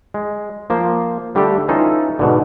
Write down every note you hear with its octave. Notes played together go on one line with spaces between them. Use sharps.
G#3
F3 A#3 C5
D3 G3 A3 D4 G4 A4
E3 C#4 D#4 F4 A4
G#2 B2 D3